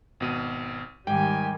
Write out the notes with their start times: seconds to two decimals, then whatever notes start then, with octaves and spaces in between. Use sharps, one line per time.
0.20 G#1 B2 D#7
1.07 G#2 D#3 G3 G4 G5 G#5